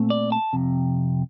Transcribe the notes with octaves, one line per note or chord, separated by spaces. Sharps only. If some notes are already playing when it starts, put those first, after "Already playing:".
Already playing: A#2 A3 C4
D5
A5
F2 C3